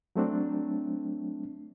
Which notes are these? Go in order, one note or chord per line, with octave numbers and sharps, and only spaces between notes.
F#3 A3 C4 D4